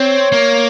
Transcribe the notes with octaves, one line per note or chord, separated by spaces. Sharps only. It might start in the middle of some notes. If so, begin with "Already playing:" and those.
Already playing: C4 C#5
A#3